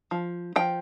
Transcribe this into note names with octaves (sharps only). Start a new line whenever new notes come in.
F3
F3 G5